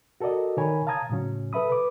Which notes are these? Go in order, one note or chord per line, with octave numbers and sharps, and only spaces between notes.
F#4 A4 A#4 D5 D#5
D#3 A#4 C#5 G#5 B5
F5 A5 A#5 D#6 G#6
A2 C#3 F#3 C#4
A4 B4 E5 B5 D#6
B4 D6